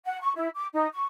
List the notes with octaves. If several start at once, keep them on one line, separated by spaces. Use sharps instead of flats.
F#5
C#6
E4
D6
D#4
C#6